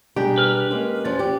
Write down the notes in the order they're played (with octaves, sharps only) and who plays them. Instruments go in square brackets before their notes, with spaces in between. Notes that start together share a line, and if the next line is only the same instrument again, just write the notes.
[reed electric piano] B2 G3 A#5 [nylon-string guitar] D4 G#4 [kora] G4
[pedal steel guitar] B4 F6
[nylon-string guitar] G#3 A#3 [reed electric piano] C#4
[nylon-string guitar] E2 F3 C#4 [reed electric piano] A6
[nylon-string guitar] G4